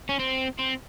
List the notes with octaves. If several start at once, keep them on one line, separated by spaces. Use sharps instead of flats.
C#4
C4
C4